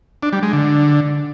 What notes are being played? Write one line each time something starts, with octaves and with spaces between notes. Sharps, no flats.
D4
G3
G#3
D3